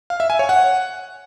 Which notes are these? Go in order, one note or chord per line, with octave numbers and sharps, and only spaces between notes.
F5
E5
G#5
C#5
F#5